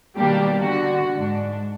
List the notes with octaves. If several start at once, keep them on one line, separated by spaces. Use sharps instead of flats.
B2 D#3 G3 A#3 D4 G4
D3 F#4
G#2 D4